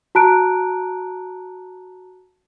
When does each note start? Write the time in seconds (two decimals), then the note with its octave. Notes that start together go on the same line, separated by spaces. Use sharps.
0.15 F#4 A5 A#5 F#6 D7